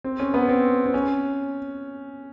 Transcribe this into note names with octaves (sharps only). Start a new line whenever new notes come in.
C4
C#4
B3
C4
C4
C#4